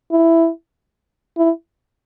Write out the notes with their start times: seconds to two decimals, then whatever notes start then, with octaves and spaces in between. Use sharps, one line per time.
0.12 E4
1.38 E4